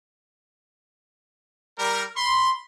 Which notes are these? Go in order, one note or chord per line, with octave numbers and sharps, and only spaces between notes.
G3 A#4
B5 C6